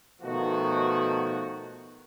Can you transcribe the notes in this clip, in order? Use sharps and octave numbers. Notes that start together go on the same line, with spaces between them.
B2 D#3 F3 A3 F#4